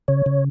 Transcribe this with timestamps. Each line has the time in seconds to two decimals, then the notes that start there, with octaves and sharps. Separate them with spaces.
0.08 C#3 C#5
0.26 C#3